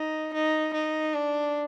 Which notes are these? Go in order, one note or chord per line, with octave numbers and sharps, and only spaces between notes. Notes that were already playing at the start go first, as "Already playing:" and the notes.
Already playing: D#4
D#4
D#4
D4